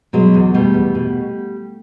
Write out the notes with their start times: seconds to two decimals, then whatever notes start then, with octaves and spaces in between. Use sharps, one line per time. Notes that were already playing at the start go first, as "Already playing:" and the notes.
0.13 B2 F#3 G#3
0.34 E2
0.54 B2 G3 A3
0.74 E2
0.95 B2